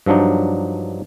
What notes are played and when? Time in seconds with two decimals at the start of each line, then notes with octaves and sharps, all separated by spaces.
0.06 G2 F3 F#3 D4 D#4